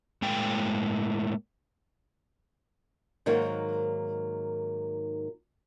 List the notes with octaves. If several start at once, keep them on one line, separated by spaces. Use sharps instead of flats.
A2 G#3 A#3 G5
G#2 D#3 F#3 A#3